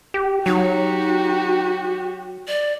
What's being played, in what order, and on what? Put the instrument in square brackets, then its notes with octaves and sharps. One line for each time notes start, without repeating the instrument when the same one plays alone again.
[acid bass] G4
[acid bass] F#3 [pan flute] D#4 [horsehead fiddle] F#4 G4
[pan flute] D5